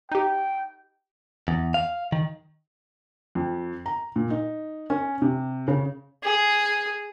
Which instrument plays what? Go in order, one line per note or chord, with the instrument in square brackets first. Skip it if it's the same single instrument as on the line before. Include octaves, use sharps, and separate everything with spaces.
[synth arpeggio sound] D#4 G4 [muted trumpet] G5
[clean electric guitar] E2
F5
D#3
[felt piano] F2
A#5
A#2
D#4
C#4
C3
C#3
[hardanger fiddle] G#4